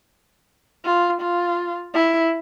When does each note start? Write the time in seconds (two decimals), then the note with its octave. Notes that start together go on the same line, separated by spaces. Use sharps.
0.85 F4
1.21 F4
1.94 E4